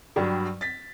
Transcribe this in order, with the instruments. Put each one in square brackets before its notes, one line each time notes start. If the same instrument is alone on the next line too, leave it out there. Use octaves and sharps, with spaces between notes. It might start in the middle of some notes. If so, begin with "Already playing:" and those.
[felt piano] G2 F#3 G3
A6 B6